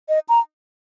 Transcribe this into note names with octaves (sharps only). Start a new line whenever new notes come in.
D#5
A#5